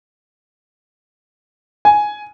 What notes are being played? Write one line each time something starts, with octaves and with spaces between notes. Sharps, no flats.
G#5